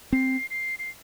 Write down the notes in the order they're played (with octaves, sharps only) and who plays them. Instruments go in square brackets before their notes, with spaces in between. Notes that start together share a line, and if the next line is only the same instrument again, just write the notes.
[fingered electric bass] C4 [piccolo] C7
[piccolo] C7
C7